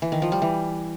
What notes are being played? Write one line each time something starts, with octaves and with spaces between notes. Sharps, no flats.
E3
D#3
F3
G3
E3